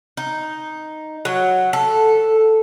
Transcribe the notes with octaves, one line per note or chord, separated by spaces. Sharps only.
D#4
F#3
A4